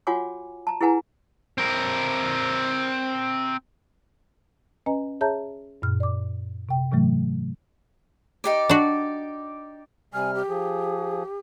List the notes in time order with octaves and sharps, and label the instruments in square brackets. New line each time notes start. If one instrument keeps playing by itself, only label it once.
[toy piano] F4 F#4 C#5 F#5 G#5 D6
A5 A#5
E4 G#4 B4 F#5 G#5 A#5
[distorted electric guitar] C4 A#4
[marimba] C#4 B4 D#5 G#5 A#5
G#4 C#5 E5 A5 A#5 G6
F#2 A#2 F6
D5 D6
C3 G5
G#2 C3 E3 F#3 A3
[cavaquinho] D#4 G4 D5
[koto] D4 F#4
[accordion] C3 G3 F6 [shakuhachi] G#5
[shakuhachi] G4
[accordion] F3 G#4